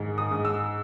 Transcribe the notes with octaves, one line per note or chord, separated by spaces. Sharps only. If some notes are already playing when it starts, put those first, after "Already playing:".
Already playing: G#2 D#3
D#6
G#2
E6